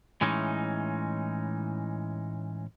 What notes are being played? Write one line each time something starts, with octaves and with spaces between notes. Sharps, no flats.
A2 E3 G#3 C#4 D#4